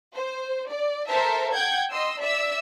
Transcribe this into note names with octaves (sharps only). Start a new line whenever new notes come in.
C5
D5
A4 A#4 C5 E5 A5
F#5 G5 G6 G#6
D#5 C6 E6
D5 E5 E6